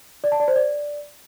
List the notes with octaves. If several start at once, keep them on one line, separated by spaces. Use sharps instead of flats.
D5
A5
D5
C5
D5